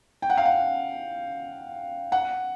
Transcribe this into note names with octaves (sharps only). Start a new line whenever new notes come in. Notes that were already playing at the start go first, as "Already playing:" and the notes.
G5
F#5
F5
F#5
F#5